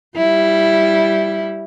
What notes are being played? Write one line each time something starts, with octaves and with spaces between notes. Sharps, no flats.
G3 E4